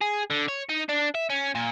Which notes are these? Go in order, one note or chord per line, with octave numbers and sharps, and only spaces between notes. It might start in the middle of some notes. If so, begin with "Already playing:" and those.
G#4
D3
C#5
D#4
D4
E5
C#4
A#2